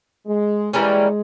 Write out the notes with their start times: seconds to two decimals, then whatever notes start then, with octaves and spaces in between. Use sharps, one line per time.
0.26 G#3
0.73 E3 G3 G#3 A#3 C#4